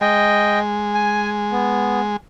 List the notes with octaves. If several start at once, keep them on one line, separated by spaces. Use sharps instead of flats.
G#3 D#5 G5
G#5
B3